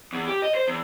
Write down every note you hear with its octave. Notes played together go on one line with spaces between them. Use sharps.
E2
G4
D#5
C5
E2